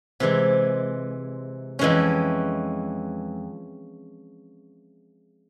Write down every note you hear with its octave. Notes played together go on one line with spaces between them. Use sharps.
C3 E3 G#3
F2 E3 G#3 C#4